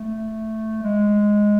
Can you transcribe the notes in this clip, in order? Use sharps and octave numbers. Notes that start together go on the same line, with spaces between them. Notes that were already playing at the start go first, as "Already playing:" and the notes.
Already playing: A3
G#3